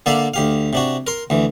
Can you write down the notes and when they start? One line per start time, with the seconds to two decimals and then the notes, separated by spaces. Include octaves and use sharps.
0.06 D3 A#3 D4 D5 E5 F5
0.34 D2 G4 F5
0.73 C3 D4 F#4
1.07 A#4 C6
1.30 D2 E3